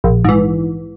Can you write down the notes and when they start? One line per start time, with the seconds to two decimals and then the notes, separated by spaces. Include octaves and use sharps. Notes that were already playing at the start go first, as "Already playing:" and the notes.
0.04 A#1
0.24 G#2 E3